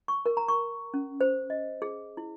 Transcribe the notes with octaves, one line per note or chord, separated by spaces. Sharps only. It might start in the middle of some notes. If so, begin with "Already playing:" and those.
C#6
A#4
A#5
C#6
C#4
C5
D#5
G#4
E4